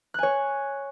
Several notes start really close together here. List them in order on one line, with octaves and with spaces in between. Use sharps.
F#6 G#5 C#5